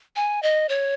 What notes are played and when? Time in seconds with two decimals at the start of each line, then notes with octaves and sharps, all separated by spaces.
0.16 G#5
0.43 D#5
0.69 C#5